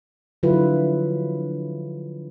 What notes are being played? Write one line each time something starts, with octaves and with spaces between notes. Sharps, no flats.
D3 F3 F#3 E4 F4 B4